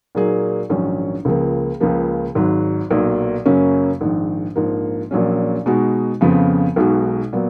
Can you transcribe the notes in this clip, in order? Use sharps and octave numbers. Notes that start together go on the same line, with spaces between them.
A#2 F#3 A#3 D#4 G#4
A#1 G#2 D#3 F#3 C#4
C#2 C#3 F3 A#3
C#2 C#3 F3 A#3
G#1 G#2 F#3
B1 A#2 F#3
F#2 C#3 F#3 A#3 C#4
A#1 G#2 D#3
A#1 G#2 F3 A#3
A#1 A#2 F#3 C#4
B2 G#3 D#4 F#4
F2 C#3 F3 B3 F4
B1 B2 G#3 D#4 F#4
A#2 F#3 B3